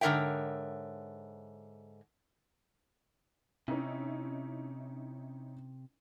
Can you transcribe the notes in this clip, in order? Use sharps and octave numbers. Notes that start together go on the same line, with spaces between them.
G#2 D3 A#4 C#5 E5 G5
C3 C#4 D#4 E4